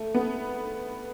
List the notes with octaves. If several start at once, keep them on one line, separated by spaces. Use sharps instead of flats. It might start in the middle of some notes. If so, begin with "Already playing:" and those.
Already playing: A3
B3